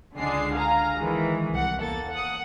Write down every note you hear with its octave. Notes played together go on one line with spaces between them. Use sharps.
C#2 D3 G#3 D4 C7
F5 G#5 A#5
D#3 E3 G#3
C2 F#5
E2 A#3 A4 A6
F#5 D#6